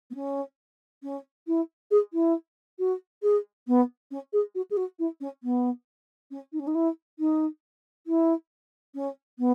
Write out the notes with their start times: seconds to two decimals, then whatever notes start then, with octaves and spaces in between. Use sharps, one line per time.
0.11 B3
0.15 C#4
1.03 C#4
1.47 E4
1.91 G#4
2.13 E4
2.79 F#4
3.23 G#4
3.67 B3
4.11 C#4
4.33 G#4
4.55 F#4
4.71 G#4
4.77 F#4
4.99 E4
5.21 C#4
5.43 B3
6.31 C#4
6.53 D#4
6.60 C#4
6.67 D#4
6.75 E4
7.19 D#4
8.07 E4
8.95 C#4
9.39 B3